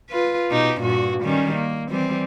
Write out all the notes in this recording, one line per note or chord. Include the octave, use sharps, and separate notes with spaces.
F4 B4
B2 D#4 G4
G2 A#2 F#4
D#3 G3 C#4
A#3
E3 G3 C4